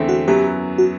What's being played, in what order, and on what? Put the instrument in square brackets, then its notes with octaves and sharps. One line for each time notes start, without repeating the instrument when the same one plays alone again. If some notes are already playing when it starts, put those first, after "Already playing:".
Already playing: [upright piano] E2 D3 A3 C4 E4
[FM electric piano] F#4
[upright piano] F#2 F#3 B3 E4 [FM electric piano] G4
[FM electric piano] F#4